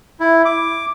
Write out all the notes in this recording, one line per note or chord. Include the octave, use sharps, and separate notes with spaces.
E4
D6